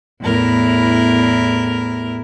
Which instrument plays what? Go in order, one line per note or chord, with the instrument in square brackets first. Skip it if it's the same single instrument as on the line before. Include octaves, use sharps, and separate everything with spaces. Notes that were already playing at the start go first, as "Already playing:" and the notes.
[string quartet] E2 A2 E4 A#4